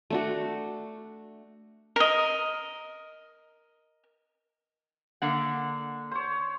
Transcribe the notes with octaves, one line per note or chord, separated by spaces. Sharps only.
A3 D4 F#4
A#4 D#5
D3 A#3 F#5
C5 C#5